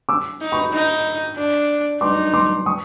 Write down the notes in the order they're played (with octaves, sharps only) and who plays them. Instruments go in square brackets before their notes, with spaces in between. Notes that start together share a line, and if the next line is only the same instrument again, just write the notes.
[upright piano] D6 E6
[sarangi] D#4
[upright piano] B5 C#6
[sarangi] D#4
D4
[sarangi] D#4 [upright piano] C6 D6
[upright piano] C6 D6
C#6 D#6